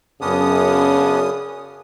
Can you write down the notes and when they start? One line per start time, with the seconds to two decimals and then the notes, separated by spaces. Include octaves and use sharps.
0.21 F#2 C#3 B3 C#4 D4 D#6